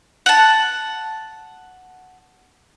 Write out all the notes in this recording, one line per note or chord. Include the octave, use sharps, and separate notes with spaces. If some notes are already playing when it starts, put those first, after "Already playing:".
F#5 A5